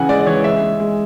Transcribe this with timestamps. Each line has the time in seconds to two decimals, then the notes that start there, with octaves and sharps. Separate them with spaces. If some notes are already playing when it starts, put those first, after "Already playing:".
Already playing: C#3 E3 F#5 G#5
0.09 G#3 D5
0.21 D5
0.27 E3 C#5
0.44 G#3 E5
0.62 G#3
0.80 G#3